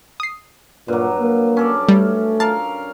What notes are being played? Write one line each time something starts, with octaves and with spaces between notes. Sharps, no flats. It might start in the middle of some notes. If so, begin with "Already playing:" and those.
D#6 C7
G2 A#2 F#3
A#3
C#4 A4 D5
G3 A3
A#4 F5 A5